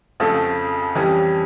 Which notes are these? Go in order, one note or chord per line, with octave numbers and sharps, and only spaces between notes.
F2 C#3 F3 A3
F2 E3 G3 C#4 G4